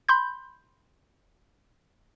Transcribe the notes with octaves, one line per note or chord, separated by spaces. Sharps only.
B5 C6 G6